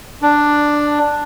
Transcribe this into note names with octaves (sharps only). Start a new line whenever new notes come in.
D4